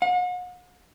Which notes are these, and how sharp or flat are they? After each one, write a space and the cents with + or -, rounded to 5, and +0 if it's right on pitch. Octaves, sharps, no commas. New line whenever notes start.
F#5 -45